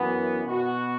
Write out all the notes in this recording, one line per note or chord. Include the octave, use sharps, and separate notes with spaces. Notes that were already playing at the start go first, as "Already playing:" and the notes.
Already playing: F#2 E3 B3
B2 B3 F#4